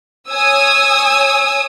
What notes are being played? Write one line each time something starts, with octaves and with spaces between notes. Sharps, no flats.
C#5 G#5 D#6 E6